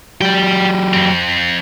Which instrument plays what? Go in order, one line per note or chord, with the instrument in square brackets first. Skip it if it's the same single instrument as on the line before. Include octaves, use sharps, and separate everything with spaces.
[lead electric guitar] F#3 G4 [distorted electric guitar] D5 G5
[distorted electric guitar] F2 C4